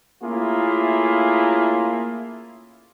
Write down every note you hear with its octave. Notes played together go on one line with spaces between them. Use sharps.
A3 A#3 C#4 E4 F4 G#4